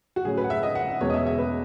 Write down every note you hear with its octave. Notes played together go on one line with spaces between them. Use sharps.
F#4
A2 F#3 C#4 G#4
B4
F#5
E5
D#5
F#5
E5
E2 B2 G#3 C#4 C#5
D#5
E5
E5
B4